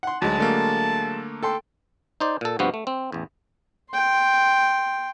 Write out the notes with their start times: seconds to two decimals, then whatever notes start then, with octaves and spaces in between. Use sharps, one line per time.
0.03 F#5 C6
0.22 D2 F#3 G#3 A5
0.39 D3 A3 A#3
1.43 A4 G5 C6
2.20 D#4 C5 D5
2.41 A#2 A4
2.59 G2 C3 F3 B3 F#4
2.74 A3
2.87 C4
3.12 A1 E2
3.91 G5 C6